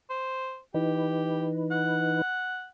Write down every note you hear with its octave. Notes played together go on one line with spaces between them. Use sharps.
C5
E3 D#4 G4 B4
F#5